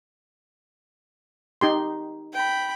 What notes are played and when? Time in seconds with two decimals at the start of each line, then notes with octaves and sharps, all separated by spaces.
1.61 D#4 G4 C6
2.33 G5 B5